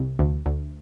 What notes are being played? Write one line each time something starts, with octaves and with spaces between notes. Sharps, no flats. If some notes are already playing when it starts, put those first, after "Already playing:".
Already playing: C2
D2
D2